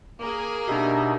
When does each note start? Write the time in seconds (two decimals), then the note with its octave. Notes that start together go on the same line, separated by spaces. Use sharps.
0.19 A#3 G#4
0.68 B2 D4 D#4 G4 E5